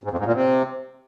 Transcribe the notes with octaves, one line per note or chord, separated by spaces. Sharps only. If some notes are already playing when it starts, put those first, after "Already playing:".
G#2
F2
G#2
A#2
C3